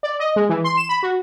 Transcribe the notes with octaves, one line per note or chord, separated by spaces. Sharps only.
D5
D#5
G#3
E3
C6
E7
B5
F#4